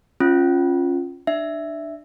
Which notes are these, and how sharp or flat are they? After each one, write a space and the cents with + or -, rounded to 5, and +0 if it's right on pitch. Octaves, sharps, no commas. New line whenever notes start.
C#4 -15 F4 +0
D4 +25 E5 +0